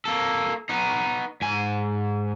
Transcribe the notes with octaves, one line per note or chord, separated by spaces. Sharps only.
A#3 A4
B3 D#4
G#2 G#5